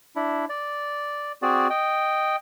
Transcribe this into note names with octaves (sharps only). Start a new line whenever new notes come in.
D4 E4
D5
C4 F#4 G#4 D5
D#5 G5